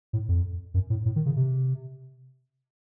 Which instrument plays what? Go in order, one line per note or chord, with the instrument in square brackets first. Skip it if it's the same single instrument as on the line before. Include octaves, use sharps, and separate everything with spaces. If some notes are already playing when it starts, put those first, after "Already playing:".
[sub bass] A2
F2
F#2
A2
A2
D#3
C#3
C3